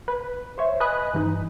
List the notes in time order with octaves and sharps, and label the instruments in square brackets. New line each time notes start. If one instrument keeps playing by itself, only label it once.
[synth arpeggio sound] B4
C5 C#5 E5
B4 D#5 G#5 B5 D#6 F#6
G2 E3 D#4